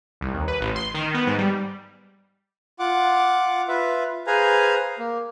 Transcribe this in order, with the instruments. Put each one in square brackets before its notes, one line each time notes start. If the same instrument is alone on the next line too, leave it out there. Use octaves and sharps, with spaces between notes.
[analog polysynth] C2
D#2
B4
A1
C6
D#3
B3
G#2
G3
[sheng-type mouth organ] F4 F#5 D6
F4 B4 E5
G#4 B4 C5 F5 G#5 A#5
A#3